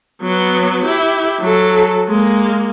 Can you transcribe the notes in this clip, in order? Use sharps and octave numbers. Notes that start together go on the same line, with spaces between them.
F#3 B3
E4 G4
F#3 A4
G#3 A#3